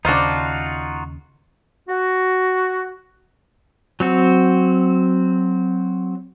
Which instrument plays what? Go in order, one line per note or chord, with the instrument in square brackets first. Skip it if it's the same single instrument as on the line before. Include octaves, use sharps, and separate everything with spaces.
[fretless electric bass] D#2 C#3 [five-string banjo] D4 C5 [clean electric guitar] D#4 F4 F#4
[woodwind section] F#4
[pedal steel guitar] F#3 C4 F#4